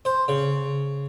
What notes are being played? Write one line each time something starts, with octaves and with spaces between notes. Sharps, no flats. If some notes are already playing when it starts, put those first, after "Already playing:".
C5
C#3